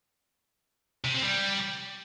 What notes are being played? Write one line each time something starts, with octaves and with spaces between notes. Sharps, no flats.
C3
C4
G3